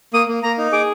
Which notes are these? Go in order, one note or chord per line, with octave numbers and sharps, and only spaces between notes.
A#3 D#6
A#3
A#3 A#5
D#4
G#4 D6